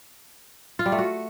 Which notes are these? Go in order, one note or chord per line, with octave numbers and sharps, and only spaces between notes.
F4
G3
A3
F#4